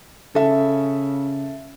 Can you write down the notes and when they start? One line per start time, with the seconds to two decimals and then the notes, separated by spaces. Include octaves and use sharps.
0.35 C#3 A4 E5